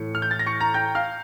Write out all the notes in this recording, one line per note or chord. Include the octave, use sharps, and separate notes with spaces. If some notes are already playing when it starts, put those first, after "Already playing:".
Already playing: A2 E3 C#7
F6
G6
A6
A#6
C#6 C#7
A#5 A#6
G5 G6
F5 F6